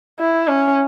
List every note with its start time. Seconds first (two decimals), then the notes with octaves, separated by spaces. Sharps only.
0.20 E4
0.48 C#4